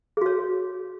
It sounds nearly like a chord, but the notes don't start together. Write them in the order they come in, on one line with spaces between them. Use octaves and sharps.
G#4 F#4 C#5